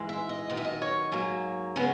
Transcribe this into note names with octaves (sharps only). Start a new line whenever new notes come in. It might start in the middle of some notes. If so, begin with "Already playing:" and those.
Already playing: G#2 E3 G#3
E5
D#5
F#2 D#3 A#3 D#5
E5
D#5
C#5
G#2 F#3 A#3
C#3 G#3 B3